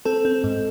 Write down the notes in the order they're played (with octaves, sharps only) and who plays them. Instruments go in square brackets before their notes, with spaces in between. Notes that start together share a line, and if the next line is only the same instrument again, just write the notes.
[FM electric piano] C4 A4
C4
G#2